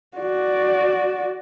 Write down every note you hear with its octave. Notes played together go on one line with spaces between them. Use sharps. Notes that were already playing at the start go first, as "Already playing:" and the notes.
F#4 D5